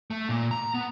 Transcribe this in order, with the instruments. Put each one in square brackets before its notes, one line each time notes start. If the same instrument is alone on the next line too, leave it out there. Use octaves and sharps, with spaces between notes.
[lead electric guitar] A3
A#2
A#5
B3